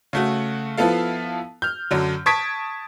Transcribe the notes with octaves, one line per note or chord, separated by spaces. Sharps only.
C#3 A3 F#4
F3 B3 E4 A4 F5
F6 G6
F#2 D3 F#3
A5 C#6 D#6 G#6 B6 D7